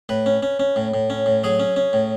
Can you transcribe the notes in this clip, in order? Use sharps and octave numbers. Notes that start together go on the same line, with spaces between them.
A2 B4
C#4
C#4
C#4
A2
A2
C#4
A2
F#3 G#4
C#4
C#4
A2